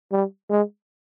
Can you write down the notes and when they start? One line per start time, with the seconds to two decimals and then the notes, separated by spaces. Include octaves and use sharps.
0.12 G3
0.50 G#3